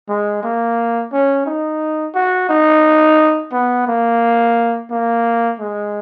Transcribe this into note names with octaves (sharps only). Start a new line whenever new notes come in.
G#3
A#3
C#4
D#4
F#4
D#4
B3
A#3
A#3
G#3